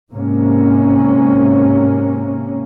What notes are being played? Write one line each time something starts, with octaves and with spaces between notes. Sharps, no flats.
G#2 C3 A#3 C#4